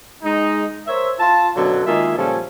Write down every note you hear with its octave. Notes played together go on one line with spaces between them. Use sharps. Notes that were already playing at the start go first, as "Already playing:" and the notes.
G#3 D#4
A#4 C5 C#5 E5
F4 A5
F#2 B2 D3 F#3
D#3 G#3 A#3 F4 G#4 E5
A#2 C#3 F3 G3 C#4 A4